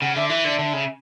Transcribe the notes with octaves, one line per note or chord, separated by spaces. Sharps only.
C#3 F#5
D3 E5
E3 E5
D3
D3
C#3